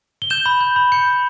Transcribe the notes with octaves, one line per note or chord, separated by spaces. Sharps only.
G7
G6 E7
B5
G6
B5
G6 C#7
B5